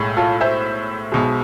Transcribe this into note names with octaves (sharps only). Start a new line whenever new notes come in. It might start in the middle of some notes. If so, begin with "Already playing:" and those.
Already playing: B1 A2 G#3
F4 A4
C5 E5
B1 B2 G#3